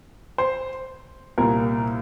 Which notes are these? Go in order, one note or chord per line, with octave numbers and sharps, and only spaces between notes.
C5
C2 A#2 A#4